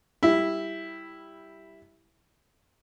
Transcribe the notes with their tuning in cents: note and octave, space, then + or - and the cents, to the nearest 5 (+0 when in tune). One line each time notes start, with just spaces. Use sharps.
G3 +0 E4 +0